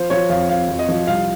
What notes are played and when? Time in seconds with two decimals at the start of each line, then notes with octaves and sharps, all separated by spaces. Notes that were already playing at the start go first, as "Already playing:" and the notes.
Already playing: F3 C5
0.10 F3 C#5
0.30 F2 F5
0.49 F2 F5
0.69 F2
0.79 D#5
0.89 F3
1.07 C2 F5